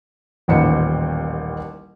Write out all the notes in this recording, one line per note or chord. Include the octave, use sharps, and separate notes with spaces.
D#1 A1 D#2 C5 C#7